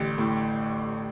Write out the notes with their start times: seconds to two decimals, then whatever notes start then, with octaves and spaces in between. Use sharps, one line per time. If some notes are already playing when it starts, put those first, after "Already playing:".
Already playing: A1 D3 G4
0.18 A2